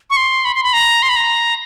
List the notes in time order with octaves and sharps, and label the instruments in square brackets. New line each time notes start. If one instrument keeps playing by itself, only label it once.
[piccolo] C#6
C6
B5
C6
B5
A#5
C6
B5
A#5